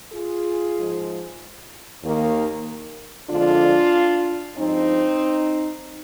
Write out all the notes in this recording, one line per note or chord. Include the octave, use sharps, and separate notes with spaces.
F4 G#4
G#2 F3 G#3
D#2 D#3 A#3
F2 D3 F3 G#3 D4 F4
G2 F3 G#3 C4 D#4